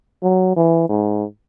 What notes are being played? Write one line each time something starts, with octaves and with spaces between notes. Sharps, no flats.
F#3
E3
G#2